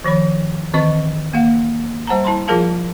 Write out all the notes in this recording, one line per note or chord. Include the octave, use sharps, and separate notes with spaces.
D#3 F3 C#5 B5
D#3 E3 C4 D#5 C#6
A#3 F5 F#5
G3 C5 F#5 A5 A#5
E4 A5 B5 C6
F3 F4 G#4 A#4 F5 A5